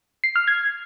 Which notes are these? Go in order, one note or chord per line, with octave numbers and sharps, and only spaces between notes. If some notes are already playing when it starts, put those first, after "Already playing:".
C7
F6
G#6